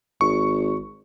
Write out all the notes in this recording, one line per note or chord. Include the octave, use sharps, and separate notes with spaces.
G#1 C#6